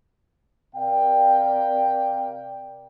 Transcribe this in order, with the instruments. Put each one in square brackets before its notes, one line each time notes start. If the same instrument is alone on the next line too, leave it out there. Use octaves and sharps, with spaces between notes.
[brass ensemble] C3 A#4 D5 F5 G5